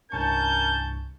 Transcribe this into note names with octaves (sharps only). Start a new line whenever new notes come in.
C2 G2 C#4 A#4 A5 C#6 G6